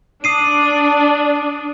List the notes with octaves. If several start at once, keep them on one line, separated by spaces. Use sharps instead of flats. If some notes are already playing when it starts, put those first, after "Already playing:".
D4 D#6 C7 D#7